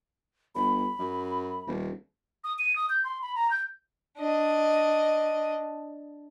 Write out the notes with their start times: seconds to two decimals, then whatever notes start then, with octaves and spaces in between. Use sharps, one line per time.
0.55 G1 B5
0.99 F#2
1.67 D#1
2.44 D#6
2.59 D#7
2.76 D#6
2.89 G6
3.04 C6
3.22 B5
3.36 A#5
3.51 G6
4.18 D4 D#5